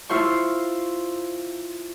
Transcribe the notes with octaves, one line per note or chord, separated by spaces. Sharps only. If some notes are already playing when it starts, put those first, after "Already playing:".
E4 F4 C5 C#6